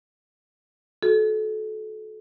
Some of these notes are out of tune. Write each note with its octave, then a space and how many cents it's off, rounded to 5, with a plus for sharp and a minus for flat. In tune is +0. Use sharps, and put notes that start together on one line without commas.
F#4 -15 A4 -25